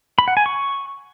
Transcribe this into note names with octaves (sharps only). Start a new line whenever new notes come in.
B5
F#5
G#5
C#6